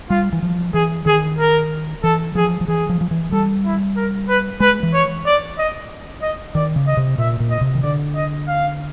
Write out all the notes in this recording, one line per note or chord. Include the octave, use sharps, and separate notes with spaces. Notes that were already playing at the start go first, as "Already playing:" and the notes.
G3 F4
E3
F3
E3 G#4
D#3 G#4
A#4
E3 A4
F3 G#4
F3
E3 G#4
F3
F3
E3
G3 A4
E4
A#4
B4
G#3 B4
E3
C#5
D5
D#5
D#5
D#3 D5
C#3
D#5
C3
A#2 E5
A#2
D#5
C3
D#3
D3 D5
D#5
F5